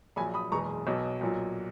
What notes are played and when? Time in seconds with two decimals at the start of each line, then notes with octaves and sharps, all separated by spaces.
0.16 A#1 A#2 F#3 G#5 B5
0.34 B5 D#6
0.52 F#1 E2 B2 G#3 A#5 C#6
0.87 B1 B2 F#3
1.21 B1 A#2 F#3